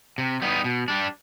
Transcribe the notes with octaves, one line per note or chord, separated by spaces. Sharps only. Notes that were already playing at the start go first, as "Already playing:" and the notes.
C3
G3 B3 D#4
B2
G3 D4